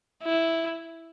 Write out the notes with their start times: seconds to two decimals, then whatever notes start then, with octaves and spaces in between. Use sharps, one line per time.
0.23 E4